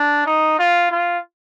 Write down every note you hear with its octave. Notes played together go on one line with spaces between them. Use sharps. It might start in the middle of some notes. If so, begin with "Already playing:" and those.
Already playing: D4
D#4
F4
F4